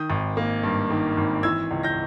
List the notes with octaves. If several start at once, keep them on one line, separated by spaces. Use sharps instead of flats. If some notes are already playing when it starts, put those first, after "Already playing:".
Already playing: D#3 D#6 G6
G#1
A#3
G2
D#3
G#1
E3 E6 G#6
C#2
G6 A#6